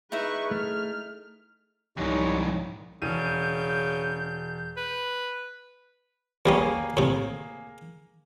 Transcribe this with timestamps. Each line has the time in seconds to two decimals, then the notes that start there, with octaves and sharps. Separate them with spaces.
0.12 D#4 E4 G#4 B4 C#6
0.51 A3 F6
1.98 C2 F2 G#2 G3 D#4 C#5
3.02 E1 C#3 G6 D#7
4.77 B4
6.46 E2 G3 A#3 C#4 G#4
6.97 A2 C3